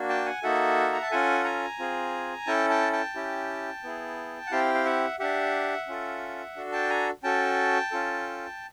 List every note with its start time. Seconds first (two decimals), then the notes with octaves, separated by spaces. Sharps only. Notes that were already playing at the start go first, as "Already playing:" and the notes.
Already playing: A#3 D4 F#4
0.09 G5 A5
0.25 F#5 G#5
0.43 A#3 D#4 F#4 A4 E5 F#5
0.93 A#5
1.02 A5
1.11 C#4 F4 A4 F#5 G#5
1.45 G#5 A#5
1.79 C4 F4 G#4
2.47 C#4 E4 A4 G5 A5
2.69 G5 A5
2.93 G5 A5
3.15 C#4 E4 G4
3.84 B3 E4 G#4
4.47 F#5
4.51 C4 E4 G4 F5 G5
4.74 F5
4.85 E5 F#5
5.20 D4 G4 E5 F#5
5.88 C#4 F4 A4
6.56 D4 F#4 A4
6.72 G5 A5
6.90 G#5 A#5
7.23 C#4 F#4 A4 G5 A5
7.91 C#4 F4 A4